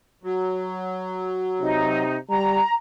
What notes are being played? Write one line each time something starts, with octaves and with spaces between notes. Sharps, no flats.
F#3
C3 D#4
G3 A#5